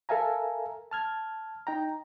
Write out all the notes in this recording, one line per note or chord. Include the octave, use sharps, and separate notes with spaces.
A4 A#4 E5 F5 G#5 A#5
A5 F6 G#6
D#4 G5 A#5